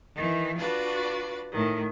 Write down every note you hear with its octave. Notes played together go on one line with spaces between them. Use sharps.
D#3 E3
D4 F4 F#4 B4 D5
A2 D#3